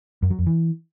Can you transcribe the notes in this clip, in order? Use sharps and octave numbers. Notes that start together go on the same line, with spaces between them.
F#2
F#3
F2
E3